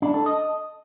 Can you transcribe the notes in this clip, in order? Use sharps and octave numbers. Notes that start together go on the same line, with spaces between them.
D4
A4
D#5